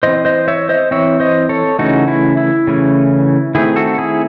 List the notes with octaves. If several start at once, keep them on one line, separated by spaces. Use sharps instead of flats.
E3 C4 C5 D#5
C5 D#5
C#5 E5
C5 D#5
E3 C4 C#5 E5
C5 D#5
A4 C#5
C#3 E3 A3 C#4 D#4 F#4
E4
E4
C#3 E3 A3 C#4
D#3 A3 C4 E4 G#4
F#4 A4
E4 G#4